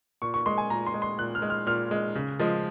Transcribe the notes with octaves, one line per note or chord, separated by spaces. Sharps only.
A#2 C#6
C#6
G#3 C6
G#5
A#2 A#5
C6
G#3
C6
A#2 F#6
F6
G#3
F6
A#2 F6
G#3
C#3
F3 G#3